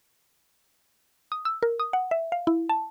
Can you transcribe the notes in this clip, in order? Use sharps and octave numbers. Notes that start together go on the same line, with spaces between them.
D#6
E6
A#4
D#6
F#5
E5
F5
E4
A5